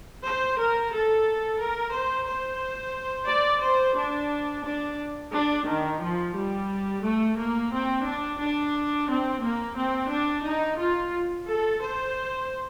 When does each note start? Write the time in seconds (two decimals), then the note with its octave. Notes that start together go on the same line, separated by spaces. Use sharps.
0.22 C5
0.57 A#4
0.91 A4
1.58 A#4
1.93 C5
2.27 C5
3.29 D5
3.63 C5
3.97 D4
4.66 D4
5.33 D4
5.68 D#3
6.02 F3
6.36 G3
7.04 A3
7.38 A#3
7.73 C4
8.07 D4
8.41 D4
9.09 C4
9.43 A#3
9.77 C4
10.11 D4
10.45 D#4
10.79 F4
11.47 A4
11.81 C5